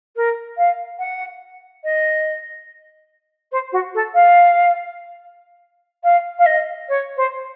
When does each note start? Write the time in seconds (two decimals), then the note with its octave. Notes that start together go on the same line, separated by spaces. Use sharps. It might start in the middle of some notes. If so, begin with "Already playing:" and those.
0.16 A#4
0.57 F5
0.99 F#5
1.84 D#5
3.52 C5
3.72 F#4
3.94 A4
4.14 F5
6.03 F5
6.39 F5
6.46 D#5
6.88 C#5
7.16 C5